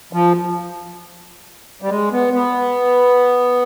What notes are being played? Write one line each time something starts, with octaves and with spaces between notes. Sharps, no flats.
F3
G3
G#3
B3
B3